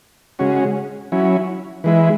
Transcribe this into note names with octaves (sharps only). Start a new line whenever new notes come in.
C#3 G#3 C#4 F#4
F#3 C#4 E4
E3 G#3 E4